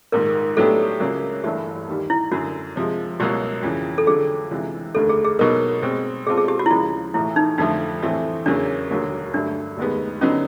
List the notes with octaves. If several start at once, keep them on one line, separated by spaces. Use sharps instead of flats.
A#1 G#2 D#3 A#4
A2 F#3 B3 D4 G4 A4
C#2 C#3 F#3 A#3
G1 G2 E3 A3 G4
D#2 D#3 G3
E4
F#2 D3 F#3 F#4
C3 F3 G#3
C#2 B2 F#3 A#3 G4
F2 C#3 E3
A4
F2 D3 F#3 G#4
C#2 C3 E3
F1 D#2 D3 A4
G#4
G#4
B2 F#3 B3 D#4 A#4
B2 G#3 C4
B2 G#3 C4 F4 G#4 A4
G#4
G4
F#4
E4
D#2 C#3 F3 G#3 F4
B1 A2 E3 A3 E4
D#4
F2 D3 F3 A3 D#4
A2 E3 A3 C4
E2 C#3 F#3 A#3 D4
E1 D#2 D3 F#3 A#3
G2 D3 F#3 A3 D4
F1 D#2 D#3 G#3 B3
D3 F#3 B3 C#4 D#4